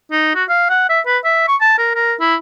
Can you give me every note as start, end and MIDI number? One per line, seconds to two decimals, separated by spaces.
0.12 0.32 63
0.35 0.44 66
0.49 0.70 77
0.70 0.86 78
0.89 1.00 76
1.07 1.18 71
1.24 1.47 76
1.48 1.56 85
1.61 1.74 81
1.78 1.90 70
1.95 2.13 70
2.20 2.35 64